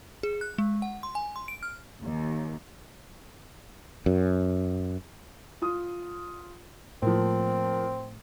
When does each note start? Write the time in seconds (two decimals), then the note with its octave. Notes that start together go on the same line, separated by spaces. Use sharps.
0.23 G#4
0.41 F#6
0.58 G#3
0.82 F#5
1.03 C6
1.15 G#5
1.36 C6
1.48 D7
1.63 F6
2.03 D#2
4.06 F#2
5.62 F4 D#6
7.02 A2 F3 A#3 C4